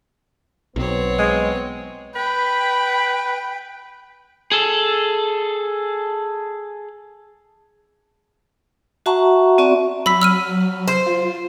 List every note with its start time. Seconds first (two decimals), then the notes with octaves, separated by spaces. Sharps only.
0.76 B1 B3 C4 C#5
1.19 G#3
2.15 B4 G5 B5
4.52 G#4 A4
9.06 F#4 E5 F#5 A5 A#5 C#6
9.58 C4 F#4 D5 E5 C#6
10.06 F#3 B5 E6 B6
10.22 E6 F6 D#7
10.88 C5
11.06 F4